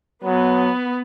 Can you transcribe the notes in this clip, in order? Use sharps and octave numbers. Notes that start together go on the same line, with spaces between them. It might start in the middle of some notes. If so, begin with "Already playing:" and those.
F#3 B3